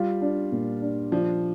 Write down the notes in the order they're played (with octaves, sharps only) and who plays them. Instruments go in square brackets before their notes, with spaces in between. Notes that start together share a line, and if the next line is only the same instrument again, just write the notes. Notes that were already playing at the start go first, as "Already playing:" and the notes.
Already playing: [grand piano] G3 [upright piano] F4
[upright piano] D4
A#2
D4
[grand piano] F3 [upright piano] D4